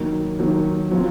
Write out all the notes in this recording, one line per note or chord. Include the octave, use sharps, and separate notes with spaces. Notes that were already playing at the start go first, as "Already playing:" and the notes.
Already playing: D#3 F#3 A#3
D#3 F#3 A#3
F#3 C4 F4